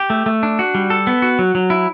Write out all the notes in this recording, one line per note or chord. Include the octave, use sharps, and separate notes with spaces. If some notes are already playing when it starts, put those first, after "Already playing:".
Already playing: G4
A3
A3
D4
F#4
G3
A4
B3
F#4
F#3
F#3
E4